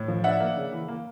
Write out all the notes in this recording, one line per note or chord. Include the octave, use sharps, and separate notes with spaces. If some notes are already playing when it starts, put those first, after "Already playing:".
Already playing: A2
F3
D4 E5 F#5
A#3
C#3
E3
A#3